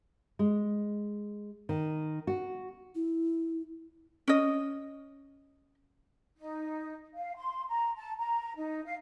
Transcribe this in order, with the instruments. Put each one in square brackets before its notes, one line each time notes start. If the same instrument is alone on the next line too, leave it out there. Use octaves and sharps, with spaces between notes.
[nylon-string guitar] G#3
D#3
F#4
[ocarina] E4
[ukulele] C#4 D#5
[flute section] D#4
F5
C6
A#5
A5
A#5
D#4
F5